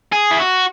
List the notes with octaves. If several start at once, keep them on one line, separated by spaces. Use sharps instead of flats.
G#4
E4
F#4